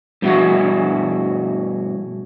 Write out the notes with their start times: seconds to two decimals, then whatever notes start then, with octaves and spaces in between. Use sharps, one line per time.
0.22 G2 B2 E4 F#4